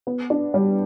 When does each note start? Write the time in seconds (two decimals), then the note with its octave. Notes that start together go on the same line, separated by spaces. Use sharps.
0.07 B3
0.30 D4
0.54 G3